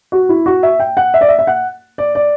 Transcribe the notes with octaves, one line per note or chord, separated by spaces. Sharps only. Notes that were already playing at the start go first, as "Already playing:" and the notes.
F#4
E4
F#4
E5
G5
F#5
E5
D5
E5
E5
F#5
D5
D5